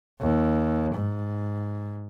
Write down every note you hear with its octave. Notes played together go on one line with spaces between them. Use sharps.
D#2
G#2